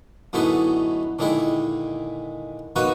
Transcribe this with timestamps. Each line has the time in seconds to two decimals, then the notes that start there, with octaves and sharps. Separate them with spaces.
0.33 F#2 A2 D3 B3 D#4 E4
1.19 A#2 D3 D#3 G#3 E4
2.76 A#3 D#4 F#4 B4 C#5